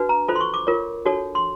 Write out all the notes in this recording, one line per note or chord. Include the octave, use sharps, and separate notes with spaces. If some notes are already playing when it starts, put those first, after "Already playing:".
Already playing: D4 F#4 B4
A#5
F4 A4 C5 B5
C6
C#6
D6
F4 A#4 C#5
D4 F#4 A4 C#5
C6